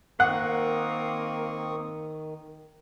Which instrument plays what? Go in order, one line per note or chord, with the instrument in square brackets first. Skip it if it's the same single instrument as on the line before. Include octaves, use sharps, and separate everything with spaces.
[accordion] D#3 [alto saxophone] A#3 [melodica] C4 C#6 D#6 [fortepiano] F#5